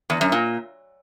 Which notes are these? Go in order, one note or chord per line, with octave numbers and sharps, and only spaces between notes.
E2
F#2
A#2